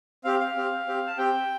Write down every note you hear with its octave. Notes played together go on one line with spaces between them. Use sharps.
C4 G4 F5
F5
C4 G4
C4 G4
A5
C4 G4 G5